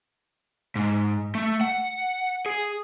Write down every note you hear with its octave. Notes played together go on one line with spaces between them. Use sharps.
G#2
A3
F#5
G#4